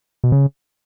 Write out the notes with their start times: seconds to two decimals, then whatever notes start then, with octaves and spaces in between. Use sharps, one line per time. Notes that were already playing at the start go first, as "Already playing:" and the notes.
0.24 B2
0.32 C#3